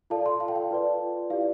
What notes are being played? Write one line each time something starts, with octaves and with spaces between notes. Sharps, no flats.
F4 A4 D5 F5 A5
A5 C6
F5 A5
G5
F5
F4 B4 D5
E4 G4 D5 F5